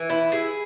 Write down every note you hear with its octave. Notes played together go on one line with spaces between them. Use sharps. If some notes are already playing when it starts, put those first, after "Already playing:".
Already playing: E3
E4
G#4